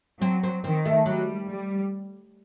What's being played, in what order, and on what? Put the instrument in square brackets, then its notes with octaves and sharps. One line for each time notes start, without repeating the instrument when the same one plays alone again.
[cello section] F#3 [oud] C4
[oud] C4
[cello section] D#3 [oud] C4
[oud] A3
[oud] F#3 [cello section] G3
[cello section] G3